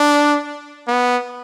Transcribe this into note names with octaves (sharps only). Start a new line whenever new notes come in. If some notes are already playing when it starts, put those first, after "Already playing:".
Already playing: D4
B3